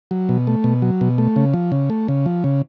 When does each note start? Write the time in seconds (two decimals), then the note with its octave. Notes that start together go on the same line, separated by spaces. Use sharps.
0.11 F#3
0.29 B2
0.47 A3
0.64 B2
0.82 F#3
1.01 B2
1.18 A3
1.36 C#3
1.54 F3
1.72 C#3
1.90 A3
2.08 C#3
2.26 F3
2.44 C#3